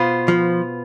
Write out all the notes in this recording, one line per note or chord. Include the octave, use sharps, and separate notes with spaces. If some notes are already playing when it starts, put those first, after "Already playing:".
Already playing: B2 B3 F4 C5
F3